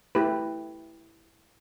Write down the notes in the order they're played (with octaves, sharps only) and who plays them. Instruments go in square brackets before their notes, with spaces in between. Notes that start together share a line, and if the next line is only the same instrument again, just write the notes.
[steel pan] A3 E4 G4 B4